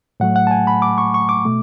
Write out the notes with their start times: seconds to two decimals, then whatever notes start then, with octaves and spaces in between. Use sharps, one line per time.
0.20 A2 F#3 A3 F#5
0.36 F#5
0.47 A5
0.51 G#5
0.67 B5
0.82 D6
0.98 C#6
1.14 C#6
1.29 D6
1.45 B2 A3